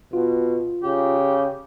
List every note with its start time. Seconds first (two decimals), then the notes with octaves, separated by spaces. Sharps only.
0.13 B2 F4
0.83 C#3 G4